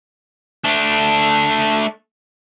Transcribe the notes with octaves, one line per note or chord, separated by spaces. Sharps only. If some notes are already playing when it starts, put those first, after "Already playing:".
A3 D4